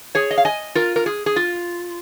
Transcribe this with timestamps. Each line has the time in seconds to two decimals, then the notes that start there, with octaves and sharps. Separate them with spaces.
0.15 G#4 C#5
0.31 D#5
0.38 F5
0.45 D#5 G#5
0.75 F4 A#4
0.96 A#4
1.06 G#4
1.26 G#4
1.36 F4